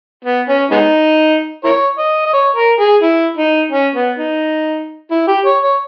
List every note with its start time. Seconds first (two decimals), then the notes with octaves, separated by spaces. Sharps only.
0.25 B3
0.48 C#4
0.71 G#3 B3 D#4
1.64 E4 A#4 C#5
1.98 D#5
2.26 D#5
2.33 C#5
2.56 A#4
2.80 G#4
3.02 E4
3.37 D#4
3.72 C#4
3.95 B3
4.19 D#4
5.11 E4
5.28 G4
5.46 C#5
5.63 C#5